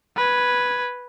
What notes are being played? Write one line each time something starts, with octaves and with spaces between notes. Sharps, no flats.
B4 G#6